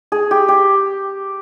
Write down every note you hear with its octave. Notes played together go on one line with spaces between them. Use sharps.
G#4
G4
G4